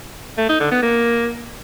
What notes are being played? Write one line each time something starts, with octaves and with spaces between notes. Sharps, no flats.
A3
D#4
D3
B3
A#3